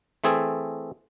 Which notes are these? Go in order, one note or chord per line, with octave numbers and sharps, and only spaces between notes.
E3 A3 C4 G#4 A4